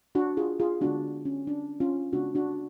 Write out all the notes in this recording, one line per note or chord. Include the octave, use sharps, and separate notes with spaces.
D4 F#4
F4 G#4
F4 G#4
D3 G#3 B3 D4 F#4
C#4
D4
C#4 F4
C#3 G#3 B3 D4 F#4
D4 F#4